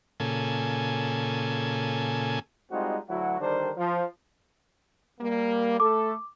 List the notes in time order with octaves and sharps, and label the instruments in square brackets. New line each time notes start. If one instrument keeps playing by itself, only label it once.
[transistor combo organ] A#2 C#3 A4 G#5
[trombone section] G3 G#3 C4 D#4 F4 F#4
D2 F#3 E4 F#4
D3 D#3 G3 D4 A#4 C5
F3
[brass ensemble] G3 A#3
[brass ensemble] A3 A4 [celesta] D6